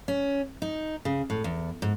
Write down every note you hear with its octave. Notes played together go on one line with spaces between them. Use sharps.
C#4
D#4
C#3
A2
E2
G#2